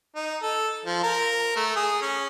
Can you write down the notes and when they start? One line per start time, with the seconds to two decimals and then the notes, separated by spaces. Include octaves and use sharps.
0.16 D#4
0.42 A4
0.85 F3
1.03 A#4
1.56 A3
1.76 G#4
2.02 C#4